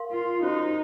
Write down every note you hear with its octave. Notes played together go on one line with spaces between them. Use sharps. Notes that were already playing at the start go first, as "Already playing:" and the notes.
Already playing: A#4 F5 C6
F4
C#4 D#4 F#4 C5